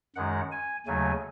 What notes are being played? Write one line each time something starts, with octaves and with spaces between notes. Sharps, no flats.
F#2 D#3 G#3 F#5
G#5
D#2 C#3 F#3 A3 G#5